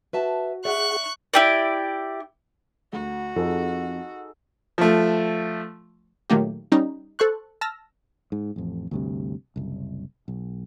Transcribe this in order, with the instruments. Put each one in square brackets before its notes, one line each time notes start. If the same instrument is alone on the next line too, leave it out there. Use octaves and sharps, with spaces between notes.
[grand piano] F#4 [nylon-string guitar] B4 E5 A5
[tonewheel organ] G#4 F#5 [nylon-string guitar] D5 [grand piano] E5 [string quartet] C#6 F#6
[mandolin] E4 G4 D5
[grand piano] D2 [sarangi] F#4
[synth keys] F2 [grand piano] D#4 G#4 A4
[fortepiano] F3 A3
[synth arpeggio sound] A#2 D#3 F#3 A3 A#3 G4
G3 C#4 D#4
A4 C5 C#6 F#6
A5 E6 F6 A#6
[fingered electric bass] G#2
A1 F2
D2 G2 C3
F#1 C2
B1